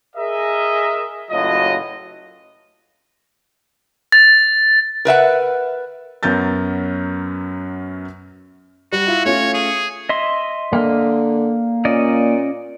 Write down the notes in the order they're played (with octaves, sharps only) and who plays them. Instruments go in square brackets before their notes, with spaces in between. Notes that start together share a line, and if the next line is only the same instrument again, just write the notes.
[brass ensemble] G#4 A#4 D#5 E5
F#1 A2 F#3 F4 D#5
[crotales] A6
[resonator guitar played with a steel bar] A#4 B4 E5 F#5
[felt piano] F#2 F#3 B3 A#4 G6 A6
[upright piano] G3 [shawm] F#4
[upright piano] E4 F4
[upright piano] A3 C#4 F4 [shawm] C#5
[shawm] G#4
[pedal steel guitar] D#5 E5 C6
[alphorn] D3 [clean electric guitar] A#3
[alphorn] A#2 [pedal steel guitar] C#4 D5 D#5